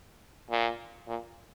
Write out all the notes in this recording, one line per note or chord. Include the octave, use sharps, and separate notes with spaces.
A#2
A#2